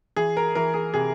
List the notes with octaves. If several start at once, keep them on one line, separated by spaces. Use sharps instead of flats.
E3 G#4
A#4
E3 A#4
G#4
C3 G#4